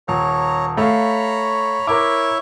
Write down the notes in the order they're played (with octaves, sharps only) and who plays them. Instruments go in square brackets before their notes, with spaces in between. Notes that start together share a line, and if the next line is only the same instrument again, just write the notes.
[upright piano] D#1 [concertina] C#5 A#5
[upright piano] A3 F5 [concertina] C#5 A#5 B5
[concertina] E4 C#5 E5 [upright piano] A#4 D6